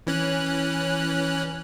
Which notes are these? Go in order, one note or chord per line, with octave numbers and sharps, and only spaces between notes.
E3 C#4 F#6